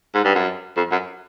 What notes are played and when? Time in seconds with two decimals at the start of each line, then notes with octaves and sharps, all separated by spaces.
0.14 G#2
0.25 G2
0.35 F#2
0.77 F2
0.91 F#2